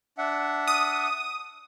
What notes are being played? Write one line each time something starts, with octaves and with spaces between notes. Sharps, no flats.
D4 E5 F#5
D#6